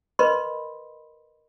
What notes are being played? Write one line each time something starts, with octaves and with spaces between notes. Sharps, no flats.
A#4 B4 D#5 B5 C6